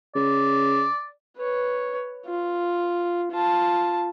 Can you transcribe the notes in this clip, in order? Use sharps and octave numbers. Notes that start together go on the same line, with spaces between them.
C#3 D5
B4 C#5
F4
F4 A5